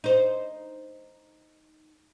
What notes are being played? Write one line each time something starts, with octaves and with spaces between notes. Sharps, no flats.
D#4 C5